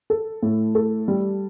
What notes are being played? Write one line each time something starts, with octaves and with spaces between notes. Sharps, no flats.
A4
A2
A4
G3